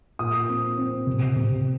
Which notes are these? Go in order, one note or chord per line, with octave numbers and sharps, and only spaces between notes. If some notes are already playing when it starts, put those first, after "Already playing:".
A#2 D#6
C4
C4
C3
C3